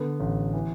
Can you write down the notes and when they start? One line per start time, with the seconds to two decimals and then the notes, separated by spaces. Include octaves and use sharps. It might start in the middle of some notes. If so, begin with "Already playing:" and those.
Already playing: D3 B3
0.20 A1
0.54 E3